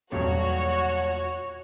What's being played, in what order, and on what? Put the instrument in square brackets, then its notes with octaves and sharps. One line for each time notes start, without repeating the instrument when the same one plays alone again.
[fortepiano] B1 G2 A#2 [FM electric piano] E2 F4 [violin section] F#4 [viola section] C#5